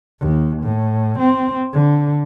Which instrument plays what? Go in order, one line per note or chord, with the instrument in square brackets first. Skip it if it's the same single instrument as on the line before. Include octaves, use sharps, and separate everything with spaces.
[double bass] D#2
A2
C4
D3